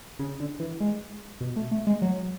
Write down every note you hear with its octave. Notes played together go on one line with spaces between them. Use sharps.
C#3
D3
E3
G#3
B2
A3
A3
G#3
F#3